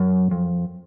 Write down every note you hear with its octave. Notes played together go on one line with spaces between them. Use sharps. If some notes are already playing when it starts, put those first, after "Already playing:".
Already playing: F#2
F2